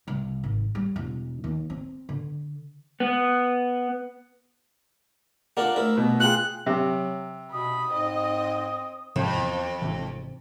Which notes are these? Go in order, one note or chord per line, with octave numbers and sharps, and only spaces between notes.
C2
G#1
G3
E1
D#2
C4
D3
B3
A#3 D4 F4 A#4 D5 F#5
D2 E4 A#4
B2 B3
F4 G#4 G5 F#6
C3 F#3
B2 B5 D#6
G#2 C4 D#5
F2 G#2 C3 F3
E2
G#1 C3 E3